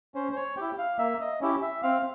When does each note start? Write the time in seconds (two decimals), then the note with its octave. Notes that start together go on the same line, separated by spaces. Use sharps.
0.15 C#4 C5
0.32 C5
0.36 C#5
0.57 E4 G4 G5
0.78 F5
0.99 A#3 E5
1.21 D#5
1.41 C#4 E4 G4
1.62 E5
1.83 C4 F5